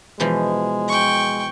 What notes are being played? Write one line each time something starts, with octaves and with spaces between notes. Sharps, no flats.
B2 E3 F3 G#3
G5 C#6